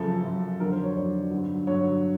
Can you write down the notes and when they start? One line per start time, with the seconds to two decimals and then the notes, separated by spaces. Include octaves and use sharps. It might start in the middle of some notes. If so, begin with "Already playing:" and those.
Already playing: F#2 C#3 F3 A4
0.23 F#2 C#3 F3
0.60 F2 D3 F#3 A#4
0.72 C5
0.83 C#5
0.95 F2 D3 F#3 D5
1.31 G2 D3 F#3
1.67 G2 D3 F#3 C#5